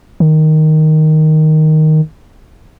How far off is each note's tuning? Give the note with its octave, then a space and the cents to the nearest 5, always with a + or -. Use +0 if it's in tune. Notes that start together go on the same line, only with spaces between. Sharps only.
D#3 +0